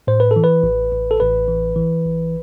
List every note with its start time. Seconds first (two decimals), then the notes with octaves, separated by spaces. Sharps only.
0.07 A2 C5
0.20 B4
0.31 A4
0.36 E3
0.44 B4
0.63 A1
0.93 A1
1.11 A4
1.20 A1 B4
1.48 E3
1.76 E3
2.04 A1